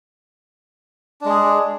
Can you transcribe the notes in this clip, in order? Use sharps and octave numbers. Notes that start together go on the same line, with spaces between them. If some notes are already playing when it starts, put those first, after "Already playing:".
G#3 D4 G#4